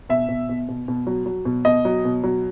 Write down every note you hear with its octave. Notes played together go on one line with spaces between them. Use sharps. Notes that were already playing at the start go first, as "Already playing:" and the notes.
B2 E5
B2
B2
B2
B2
F#3
F#3
B2
B2 D#5
F#3
B2
F#3